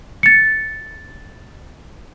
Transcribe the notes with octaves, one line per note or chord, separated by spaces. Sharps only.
A6 C#7